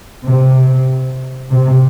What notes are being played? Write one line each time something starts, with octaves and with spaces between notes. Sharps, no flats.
C3
C3